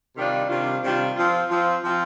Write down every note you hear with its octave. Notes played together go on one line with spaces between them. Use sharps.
C3 D#3 G3 D4 F4
C3 D#3 G3 D4 F4
C3 D#3 G3 D4 F4
F3 C4 F4
F3 C4 F4
F3 C4 F4